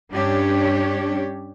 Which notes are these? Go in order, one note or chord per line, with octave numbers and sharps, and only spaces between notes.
G2 C#4 D4 G4 C#5